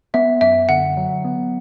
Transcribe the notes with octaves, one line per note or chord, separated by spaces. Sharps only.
B3 E5
F#2 E5
D3 F#5
F#3
B3